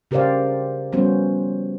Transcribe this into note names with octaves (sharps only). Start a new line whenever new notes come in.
C#3 G4 A#4 C5 D5 F5
F3 G3 B3 C#4 F#4 C5